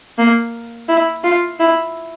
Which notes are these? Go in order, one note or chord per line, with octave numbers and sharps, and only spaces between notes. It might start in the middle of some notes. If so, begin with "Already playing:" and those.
A#3
E4
F4
E4